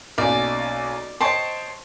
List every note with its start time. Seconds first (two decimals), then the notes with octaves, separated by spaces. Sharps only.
0.18 B1 A#3 C#4 D5
1.20 C5 C#5 D#5 G5 A5 C#6